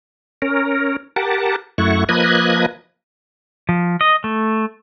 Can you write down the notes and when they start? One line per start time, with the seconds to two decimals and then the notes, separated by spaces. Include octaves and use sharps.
0.42 C#4 A#4
1.16 G4 A#4 F#5 A5
1.78 F#2 A3 E4 F#5 C#6
2.09 F3 A#3 B4 D#5 F#6 G#6
3.69 F3
4.01 D#5
4.24 A3